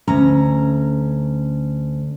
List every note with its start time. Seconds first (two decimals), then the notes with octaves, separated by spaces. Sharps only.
0.08 D2 C#4 A#5